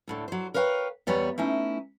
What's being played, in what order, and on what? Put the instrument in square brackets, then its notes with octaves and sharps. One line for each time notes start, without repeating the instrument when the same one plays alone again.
[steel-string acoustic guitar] D2 A2 D3
F#3 C5
A#4 B4 C#5 F5 G5
E2 G3 B3 B4 C#5 A#5
A3 C#4 D#4 E4